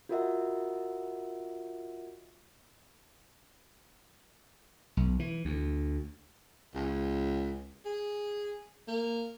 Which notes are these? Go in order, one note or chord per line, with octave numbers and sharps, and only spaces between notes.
F4 F#4 A#4 D#5 E5 F#5
B1
E3
D2
C#2
G#4
A#3